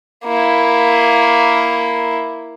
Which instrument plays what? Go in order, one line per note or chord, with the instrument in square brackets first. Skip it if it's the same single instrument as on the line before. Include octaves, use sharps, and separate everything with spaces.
[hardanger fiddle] A#3 E4